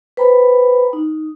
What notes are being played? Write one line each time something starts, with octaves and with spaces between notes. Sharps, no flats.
B4 C5 G5 A#5 B5
D#4